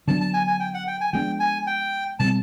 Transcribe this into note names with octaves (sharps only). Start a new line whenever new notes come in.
D3 F#3 B3 D4 A5
A5
G#5
G#5
G5
F#5
G5
G#5
F3 G#3 B3 D4 G5
G#5
G5
B2 G3 C4 A5